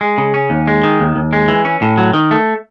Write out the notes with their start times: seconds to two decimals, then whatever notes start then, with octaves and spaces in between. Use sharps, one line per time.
0.01 G#3
0.18 C#3
0.34 C#4
0.50 D#2
0.67 G#3
0.84 D#3
1.00 D#2
1.16 D#2
1.33 G#3
1.48 E3
1.65 C#4
1.82 A2
1.98 F#3
2.13 D#3
2.31 A3